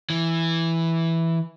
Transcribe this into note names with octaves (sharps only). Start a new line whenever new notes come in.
E3